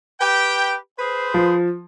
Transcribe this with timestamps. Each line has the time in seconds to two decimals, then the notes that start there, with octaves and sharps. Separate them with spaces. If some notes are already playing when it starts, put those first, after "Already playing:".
0.20 G4 B4 G5
0.98 G#4 B4 C5
1.34 F3